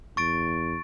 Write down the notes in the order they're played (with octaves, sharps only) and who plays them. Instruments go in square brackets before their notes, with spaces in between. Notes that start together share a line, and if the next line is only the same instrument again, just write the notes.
[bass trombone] E2 [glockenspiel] C#6 A6 D7